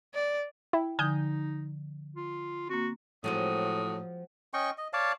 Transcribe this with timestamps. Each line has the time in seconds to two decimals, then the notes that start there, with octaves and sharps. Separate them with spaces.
0.14 D5
0.73 E4 G5
0.99 D3 F3 D#4 G#5 D#6 G6
2.16 F4
2.70 A#3 C4 F#4
3.24 A2 F3 F#3 G#3 C4 D#6
4.54 C#4 D#5 G5 C#6
4.78 D#5
4.93 C#5 D5 F5 A5